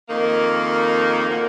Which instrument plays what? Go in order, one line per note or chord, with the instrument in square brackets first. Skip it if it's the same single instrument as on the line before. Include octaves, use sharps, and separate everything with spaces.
[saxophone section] F2 D#3 A#3
A#2 F#3 A#3